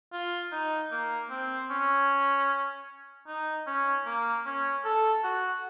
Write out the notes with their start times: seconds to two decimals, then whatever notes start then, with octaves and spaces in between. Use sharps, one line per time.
0.12 F4
0.52 D#4
0.92 A#3
1.30 C4
1.70 C#4
3.27 D#4
3.67 C#4
4.06 A#3
4.46 C#4
4.85 A4
5.24 F#4